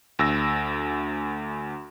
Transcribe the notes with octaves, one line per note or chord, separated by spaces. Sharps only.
D2 E6 A#6